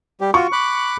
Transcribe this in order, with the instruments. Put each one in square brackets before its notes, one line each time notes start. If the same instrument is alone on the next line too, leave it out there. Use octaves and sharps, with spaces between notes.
[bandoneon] G3 G4
[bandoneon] F4 F#4 [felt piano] C#6
[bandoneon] B5 D6 F#6